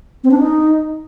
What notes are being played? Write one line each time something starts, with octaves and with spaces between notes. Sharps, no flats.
C4
D4
D#4